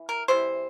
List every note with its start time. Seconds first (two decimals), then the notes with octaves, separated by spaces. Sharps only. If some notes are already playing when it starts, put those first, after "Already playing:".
Already playing: E3
0.09 A#4
0.28 C3 E3 G3 C5